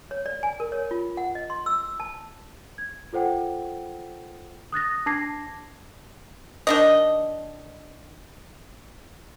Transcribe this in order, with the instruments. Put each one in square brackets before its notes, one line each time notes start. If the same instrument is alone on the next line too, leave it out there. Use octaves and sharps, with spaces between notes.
[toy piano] C#5
D5
G#5
A#4
C#5
F4
F#5
D#5
C6
E6
A5
[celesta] G#6
F4 A4 C5 F#5 G5
D#6 F#6 A6 A#6
D4 A5 D6 G#6 A#6 C7
[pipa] D#3 D4 D#5